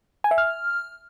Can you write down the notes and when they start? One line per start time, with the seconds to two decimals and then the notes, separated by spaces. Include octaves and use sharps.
0.24 G#5
0.31 E5
0.38 F6